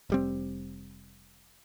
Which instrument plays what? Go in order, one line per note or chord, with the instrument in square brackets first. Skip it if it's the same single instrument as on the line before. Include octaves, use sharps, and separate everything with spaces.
[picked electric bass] F1 G3 C4